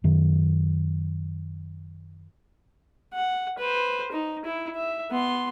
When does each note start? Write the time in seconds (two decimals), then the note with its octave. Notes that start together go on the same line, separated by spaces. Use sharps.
0.04 F#2 D#3
3.13 F#5
3.58 B4 C5
4.12 D#4
4.45 E4
4.76 E5
5.11 B3 C6